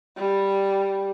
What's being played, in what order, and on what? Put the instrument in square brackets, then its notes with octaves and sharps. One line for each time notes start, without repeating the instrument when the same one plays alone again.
[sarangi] G3